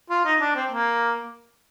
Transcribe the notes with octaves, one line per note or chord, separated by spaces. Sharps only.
F4
D#4
D4
C4
A#3